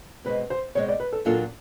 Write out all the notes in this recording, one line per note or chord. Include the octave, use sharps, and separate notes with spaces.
B2 G#3 C4 B4
C5
B2 G#3 C4 C#5
D5
B4
A4
A#2 F#3 A#3 D4 F4 A4